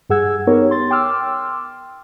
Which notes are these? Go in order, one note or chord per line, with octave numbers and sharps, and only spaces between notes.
G2 G3 G#4 F#5 E6 G#6
B3 D#4 G4 A#4 C#5
C6 A6
G5 C6 D6 E6 F6